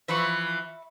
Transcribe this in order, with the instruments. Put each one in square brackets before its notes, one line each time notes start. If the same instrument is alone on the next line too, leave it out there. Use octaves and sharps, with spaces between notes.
[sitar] E3 F3 [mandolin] E5 B5 C#6